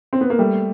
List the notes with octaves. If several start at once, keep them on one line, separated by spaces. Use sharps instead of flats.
C4
B3
A#3
G3 A3